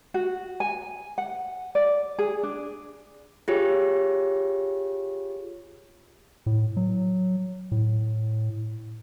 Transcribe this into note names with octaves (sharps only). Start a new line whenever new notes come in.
F#4
G#5
F#5
D5
G#4
D4
F4 G4 G#4 C#5
A2
F#3
A2